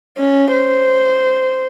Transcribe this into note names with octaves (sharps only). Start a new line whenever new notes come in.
C#4
C5